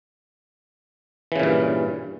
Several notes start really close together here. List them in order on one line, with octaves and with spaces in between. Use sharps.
E3 C#3 A#2 G2